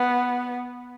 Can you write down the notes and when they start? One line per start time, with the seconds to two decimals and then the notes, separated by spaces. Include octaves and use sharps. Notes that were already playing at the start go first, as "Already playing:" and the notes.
Already playing: B3